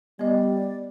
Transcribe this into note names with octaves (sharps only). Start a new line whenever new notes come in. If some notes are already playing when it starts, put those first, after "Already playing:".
G3 B3 D5 D#5